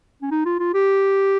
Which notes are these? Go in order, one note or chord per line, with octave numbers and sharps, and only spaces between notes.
C#4
D#4
F4
F4
G4